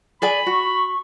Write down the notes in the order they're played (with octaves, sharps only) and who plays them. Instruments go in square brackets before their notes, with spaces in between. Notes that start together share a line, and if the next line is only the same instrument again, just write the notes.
[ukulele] G#4 D5 G#5 [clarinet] B5
[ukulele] F#4 [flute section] C#6